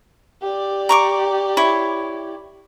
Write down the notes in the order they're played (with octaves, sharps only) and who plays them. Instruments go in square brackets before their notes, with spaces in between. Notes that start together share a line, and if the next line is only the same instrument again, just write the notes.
[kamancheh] G4 D5
[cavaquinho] A#5 C#6 D6
E4 C#5